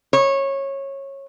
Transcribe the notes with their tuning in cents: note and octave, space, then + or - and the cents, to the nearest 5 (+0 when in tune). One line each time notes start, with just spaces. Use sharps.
C#5 -20